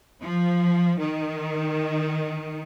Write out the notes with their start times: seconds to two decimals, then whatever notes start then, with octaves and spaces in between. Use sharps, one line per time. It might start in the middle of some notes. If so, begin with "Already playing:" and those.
0.22 F3
0.99 D#3